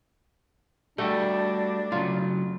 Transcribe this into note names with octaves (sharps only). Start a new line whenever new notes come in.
G3 A3 D4 F#4 G4
C#3 F#3 F4